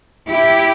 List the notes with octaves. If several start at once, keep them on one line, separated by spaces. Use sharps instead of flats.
E4 G4